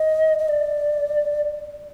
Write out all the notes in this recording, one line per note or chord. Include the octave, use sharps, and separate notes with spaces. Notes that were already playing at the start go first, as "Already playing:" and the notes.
Already playing: D#5
D#5
D5